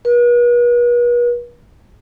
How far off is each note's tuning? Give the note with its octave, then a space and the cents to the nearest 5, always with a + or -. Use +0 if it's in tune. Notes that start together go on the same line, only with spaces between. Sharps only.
B4 -45